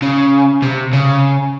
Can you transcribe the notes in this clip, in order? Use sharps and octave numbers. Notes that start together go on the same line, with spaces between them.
C#3
C3
C#3